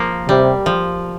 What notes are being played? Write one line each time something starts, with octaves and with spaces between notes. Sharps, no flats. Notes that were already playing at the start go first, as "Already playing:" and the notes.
Already playing: F3 A#3
C3 G3
F3